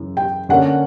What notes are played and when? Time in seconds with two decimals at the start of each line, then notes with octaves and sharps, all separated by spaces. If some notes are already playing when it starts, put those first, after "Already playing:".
Already playing: F#2 C#3 E3
0.17 G5
0.49 D3 A#3 C#4 F#5